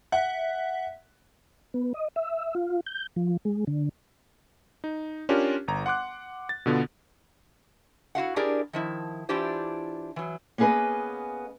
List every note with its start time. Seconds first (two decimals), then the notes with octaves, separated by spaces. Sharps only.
0.12 E5 F#5
1.74 B3
1.94 D#5
2.16 E5
2.55 F4
2.86 G6
3.16 F3
3.45 G#3
3.67 D3
4.84 D#4
5.29 C#4 D4 F4 G4 A#4
5.68 G1 A#5
5.86 F#5 C6 D6 F#6
6.49 A6
6.66 B2 D3 B3 F4
8.15 E4 F#4 F5 F#5
8.36 D4 E4 G4 G#4 A#4 D5
8.73 D#3 F3 E4
9.29 E3 D4 E4 F4 G4 C5
10.16 E3 F#3
10.58 A#3 B3 C#4 G#4 B4 D#5